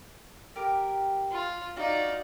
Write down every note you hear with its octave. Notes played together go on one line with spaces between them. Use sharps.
G4 A#4
F4
D#4 F4 F#4 D5